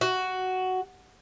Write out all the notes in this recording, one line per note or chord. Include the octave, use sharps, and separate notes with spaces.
F#4